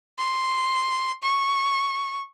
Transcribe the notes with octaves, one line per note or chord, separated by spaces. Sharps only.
C6
C#6